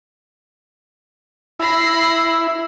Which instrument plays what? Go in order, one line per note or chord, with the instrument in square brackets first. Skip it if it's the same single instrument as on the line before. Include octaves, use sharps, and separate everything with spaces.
[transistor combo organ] E4 [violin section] B5 A#6 C7